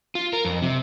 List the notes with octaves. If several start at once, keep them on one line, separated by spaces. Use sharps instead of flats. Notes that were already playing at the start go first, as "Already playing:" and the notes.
F4
A#4
F2
C3